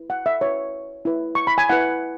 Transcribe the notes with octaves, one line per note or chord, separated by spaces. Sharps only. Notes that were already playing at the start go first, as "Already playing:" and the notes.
Already playing: E4 B4
F#5
E5
E4 B4 C#5
E4 B4
C#6
B5
G#5
E4 B4 F#5